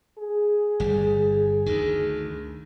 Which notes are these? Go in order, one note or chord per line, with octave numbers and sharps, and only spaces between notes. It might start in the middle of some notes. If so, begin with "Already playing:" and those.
G#4
G1 G3
D2 D#3